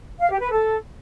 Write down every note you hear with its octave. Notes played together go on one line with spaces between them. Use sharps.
F5
G4
B4
A4